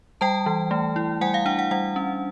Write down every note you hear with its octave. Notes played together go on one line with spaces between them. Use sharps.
G3 G5 A5
E3
A3
E4
G3 F#5 G#5
F5
D4 F#5
F#5
G3 F#5
C#4